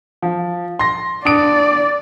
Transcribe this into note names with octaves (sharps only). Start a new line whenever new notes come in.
F3
C6 A#6
D4 D5 D#6 D7